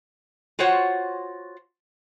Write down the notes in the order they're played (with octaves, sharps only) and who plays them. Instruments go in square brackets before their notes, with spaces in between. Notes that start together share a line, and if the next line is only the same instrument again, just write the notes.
[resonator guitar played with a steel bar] F4 F#4 C5 C#5 F#5